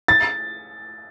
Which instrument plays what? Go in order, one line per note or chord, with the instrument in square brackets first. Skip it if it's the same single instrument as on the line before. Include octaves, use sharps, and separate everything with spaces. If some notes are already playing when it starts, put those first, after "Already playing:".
[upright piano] A6